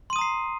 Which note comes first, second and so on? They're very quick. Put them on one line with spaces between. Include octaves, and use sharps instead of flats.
C6 D#7 D#6 A#5 C7